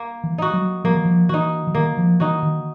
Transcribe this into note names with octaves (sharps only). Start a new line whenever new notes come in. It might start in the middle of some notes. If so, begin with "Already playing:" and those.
Already playing: A#3
E3
D#4 F#4
F#3
F3 A#3
E3
F3
E3 D#4 F#4
E3
D#3 A#3
F3
E3 D#4 F#4
D#3